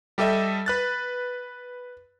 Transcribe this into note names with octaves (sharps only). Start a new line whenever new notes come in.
G3 G4 A4 D#5 E5
B4 F#6 A6